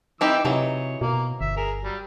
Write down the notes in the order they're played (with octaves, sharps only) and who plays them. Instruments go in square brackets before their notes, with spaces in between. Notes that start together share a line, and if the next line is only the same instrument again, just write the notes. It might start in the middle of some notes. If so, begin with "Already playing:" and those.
[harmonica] E3 D6 E6 [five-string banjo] C4 D#4 G4
[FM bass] C3 [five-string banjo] E3 F#3 D#4 [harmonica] C#5
[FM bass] B2 [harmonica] A#3
[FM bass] G1 [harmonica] E5
[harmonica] G#4 A#4
F#3 G3